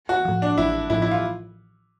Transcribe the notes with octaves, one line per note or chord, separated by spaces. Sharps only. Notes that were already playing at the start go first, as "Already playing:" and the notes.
F#4
A2 F3
D4
A1 E4
A2 F3 E4
E4
F4